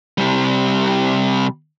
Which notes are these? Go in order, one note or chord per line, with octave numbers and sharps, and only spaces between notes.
C3 G3